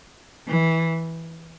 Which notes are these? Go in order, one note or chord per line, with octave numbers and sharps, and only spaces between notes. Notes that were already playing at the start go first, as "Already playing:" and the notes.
E3